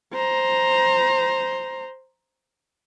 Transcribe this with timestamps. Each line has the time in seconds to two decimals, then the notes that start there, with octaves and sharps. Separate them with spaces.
0.14 C5 A#5